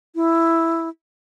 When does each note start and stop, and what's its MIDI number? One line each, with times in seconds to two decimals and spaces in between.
0.15 0.89 64